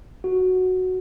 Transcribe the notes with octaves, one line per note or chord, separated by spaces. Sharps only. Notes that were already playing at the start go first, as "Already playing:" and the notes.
F#4